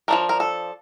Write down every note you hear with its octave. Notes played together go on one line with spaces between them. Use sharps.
F3 A3 D4 A#4
A#4
A4